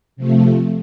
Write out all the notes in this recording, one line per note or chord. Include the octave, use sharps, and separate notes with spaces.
C3 F3 A3